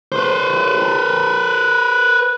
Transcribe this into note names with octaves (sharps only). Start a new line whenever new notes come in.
B4 C5